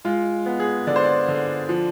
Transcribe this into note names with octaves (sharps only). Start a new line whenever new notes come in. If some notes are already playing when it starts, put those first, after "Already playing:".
G#3 F4
B3
G#4
D3 D5
C5
D5
D3
F3